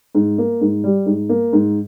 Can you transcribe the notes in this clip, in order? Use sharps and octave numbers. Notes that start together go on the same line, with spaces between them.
G#2
A#3
G#2
G3
G#2
A#3
G#2